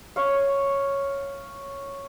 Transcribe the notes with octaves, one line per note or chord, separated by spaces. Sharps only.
C#5 F5